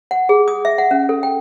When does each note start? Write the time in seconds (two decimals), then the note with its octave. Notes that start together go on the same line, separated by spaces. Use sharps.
0.11 F#5
0.29 G#4
0.48 D#6
0.65 E5
0.78 F#5
0.91 C#4
1.09 A4
1.23 G5